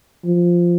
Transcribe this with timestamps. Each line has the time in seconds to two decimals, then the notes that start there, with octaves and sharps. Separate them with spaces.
0.25 F3